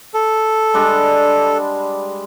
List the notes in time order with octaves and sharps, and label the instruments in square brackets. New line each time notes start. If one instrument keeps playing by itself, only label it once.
[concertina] A4
[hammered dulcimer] G3 G#3 D4